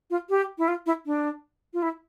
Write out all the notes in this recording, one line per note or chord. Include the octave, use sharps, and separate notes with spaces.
F4
G4
E4
F4
E4
D4
F4
E4